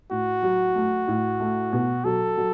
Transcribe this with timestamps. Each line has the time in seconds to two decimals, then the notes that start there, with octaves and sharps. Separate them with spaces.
0.11 A2 F#4
0.43 F#3
0.75 A3
1.08 A2
1.40 A3
1.73 B2
2.05 F#3 A4
2.37 F#3